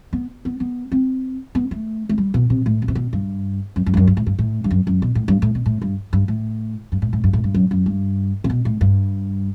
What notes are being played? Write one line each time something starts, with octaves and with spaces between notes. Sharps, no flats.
B3
B3
B3
C4
B3
A3
A3
G3
B2
C3
A2
B2
C3
B2
G2
F#2
F#2
G2
F#2
G2
A2
G2
A2
G2
F#2
F#2
B2
A2
G2
A2
B2
A2
G2
G2
A2
G2
A2
A2
G2
A2
G2
F#2
F#2
G2
C3
B2
A2
G2